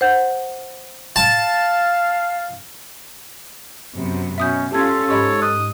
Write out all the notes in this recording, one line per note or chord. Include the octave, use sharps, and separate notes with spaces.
C5 F#5 G6
F5 A5
F#2 C3 B3
B2 C#4 E5 D#6 G6
C#4 F4 G4 A4 A5 G#6
G#2 G4 C#5 D#5 B5
D#5 F#6